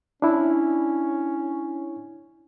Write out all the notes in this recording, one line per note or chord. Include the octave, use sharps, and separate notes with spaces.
C#4 D4 E4